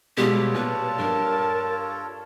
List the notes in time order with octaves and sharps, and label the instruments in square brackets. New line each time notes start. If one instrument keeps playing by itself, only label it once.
[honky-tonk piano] B2 G3 G#3 [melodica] F4 A4 C#5 [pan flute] G4
[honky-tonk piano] A#2 [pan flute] B4 [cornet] A5
[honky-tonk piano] G2 [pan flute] A#4